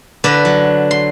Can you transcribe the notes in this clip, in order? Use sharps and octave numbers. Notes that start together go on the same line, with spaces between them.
D3 B4 D5
F#3
C6